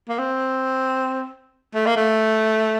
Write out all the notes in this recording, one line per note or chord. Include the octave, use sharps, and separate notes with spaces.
A#3
C4
A3
A#3
A3